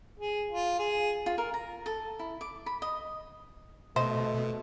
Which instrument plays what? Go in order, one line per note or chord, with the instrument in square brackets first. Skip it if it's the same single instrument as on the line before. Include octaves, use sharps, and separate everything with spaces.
[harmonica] G#4
F4
G#4
[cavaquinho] F4
A#4
A#5
A4
E4
D6
B5
D#5
[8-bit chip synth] B2 [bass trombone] A3 [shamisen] C5 [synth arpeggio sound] D#5